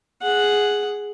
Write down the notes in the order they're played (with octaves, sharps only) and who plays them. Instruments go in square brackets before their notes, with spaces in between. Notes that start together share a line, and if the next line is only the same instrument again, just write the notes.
[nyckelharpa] G#4 F#5